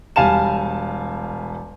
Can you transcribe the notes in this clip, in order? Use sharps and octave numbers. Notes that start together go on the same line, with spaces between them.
E1 G3 F5 G#5 A5 E7